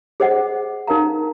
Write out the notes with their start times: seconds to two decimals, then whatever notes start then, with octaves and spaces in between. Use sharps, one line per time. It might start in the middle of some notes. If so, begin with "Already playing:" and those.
0.20 G#4 C5 D#5 F#5
0.87 D#4 A#4 F5 A#5